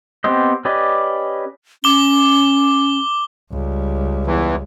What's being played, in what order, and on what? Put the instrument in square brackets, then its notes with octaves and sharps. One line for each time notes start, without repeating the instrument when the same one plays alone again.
[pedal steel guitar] B3 C4 G4 C5 D#5
C#4 G4 B4 D5 D#5
[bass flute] C#4 [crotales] D6 G7
[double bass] C#2 G3
[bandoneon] E2 E3